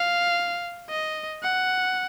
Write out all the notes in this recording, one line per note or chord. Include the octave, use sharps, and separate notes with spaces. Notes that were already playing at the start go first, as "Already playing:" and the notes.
Already playing: F5
D#5
F#5